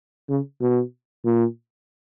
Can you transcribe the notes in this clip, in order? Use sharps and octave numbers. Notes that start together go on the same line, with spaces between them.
C#3
B2
A#2